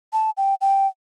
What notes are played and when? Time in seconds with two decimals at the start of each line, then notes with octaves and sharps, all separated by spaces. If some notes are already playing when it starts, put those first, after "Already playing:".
0.13 A5
0.37 G5
0.61 G5